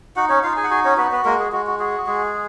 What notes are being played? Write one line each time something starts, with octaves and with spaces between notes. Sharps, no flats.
D#4 F#4 F#5
C#4 C#5
D#4 F4 F5
G#4 G#5
F#5
F#4 G#4 G#5
C#4 C#5
B3 F#4 B4
B3 B4
G#3 A#3 A#4
G#4
G#3 F#4
F#4
F#4 G#4
G#3 G#4